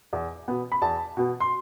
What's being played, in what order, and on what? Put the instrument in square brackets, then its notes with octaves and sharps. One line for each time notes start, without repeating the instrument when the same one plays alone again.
[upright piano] E2
B2 B3
B5
E2 A5
B2 B3
C6